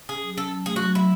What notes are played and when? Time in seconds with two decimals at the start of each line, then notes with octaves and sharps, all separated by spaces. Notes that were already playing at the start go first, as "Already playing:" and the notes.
0.09 C#4 G#4
0.23 F#3
0.37 C#4 A4
0.52 F#3
0.66 A3 G#4
0.76 F#3 F#4
0.95 F#3 E4